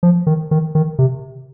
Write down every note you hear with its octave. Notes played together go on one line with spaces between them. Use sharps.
F3
D#3
D#3
D#3
C3